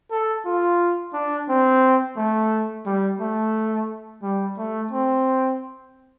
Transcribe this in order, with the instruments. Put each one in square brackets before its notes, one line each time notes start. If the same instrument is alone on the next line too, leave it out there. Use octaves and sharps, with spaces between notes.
[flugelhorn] A4
F4
D4
C4
A3
G3
A3
G3
A3
C4